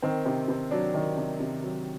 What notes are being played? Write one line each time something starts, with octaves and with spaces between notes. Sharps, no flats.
D#3 C4
C3 C4
C3 C4
F#3 D4
D#3
C3
C3
F#3